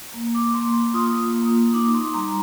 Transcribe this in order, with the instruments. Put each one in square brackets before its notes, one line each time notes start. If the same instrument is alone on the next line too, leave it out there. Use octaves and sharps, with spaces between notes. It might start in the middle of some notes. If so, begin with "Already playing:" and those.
[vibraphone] A#3
D6
A#3 C6
C6
F4 D#6
A#3
D#4 D6
C6
G3 A#5